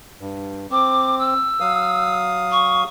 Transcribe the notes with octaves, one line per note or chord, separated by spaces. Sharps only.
G2
C4 D6
E6
F#3 F5 D#6
C#6